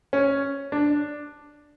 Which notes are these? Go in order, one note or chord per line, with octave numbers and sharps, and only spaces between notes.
C#4
D4